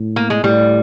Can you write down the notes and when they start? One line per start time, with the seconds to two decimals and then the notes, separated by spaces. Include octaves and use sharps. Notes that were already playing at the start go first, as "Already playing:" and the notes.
Already playing: A2
0.16 A#3
0.30 G#3
0.44 A2 G3